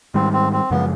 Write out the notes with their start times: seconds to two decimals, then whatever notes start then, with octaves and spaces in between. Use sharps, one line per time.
0.14 G#2 D#3 G3 C4
0.33 C4
0.53 C4
0.71 F#2 C#3 F3 G#3 B3